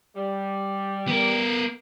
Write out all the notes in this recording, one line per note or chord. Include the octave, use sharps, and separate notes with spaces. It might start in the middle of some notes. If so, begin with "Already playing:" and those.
G3
B3 A#4